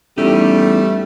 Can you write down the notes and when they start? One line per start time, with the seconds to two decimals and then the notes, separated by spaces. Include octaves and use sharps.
0.18 E2 G3 A3 C#4 D#4 G4